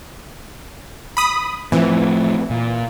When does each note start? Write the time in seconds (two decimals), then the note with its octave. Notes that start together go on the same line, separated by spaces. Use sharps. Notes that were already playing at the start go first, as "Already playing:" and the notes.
1.17 B5 D#6
1.72 A2 E3 F3 C4
2.50 A#2